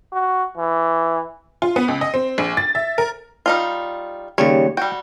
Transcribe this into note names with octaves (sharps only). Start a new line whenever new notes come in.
F#4
E3
F4
B3
C#2
D#5
C4
A#1
A6
E5
A#4
G3 D#4 F4
D#2 C#3 G3 C#5
G3 F#4 G5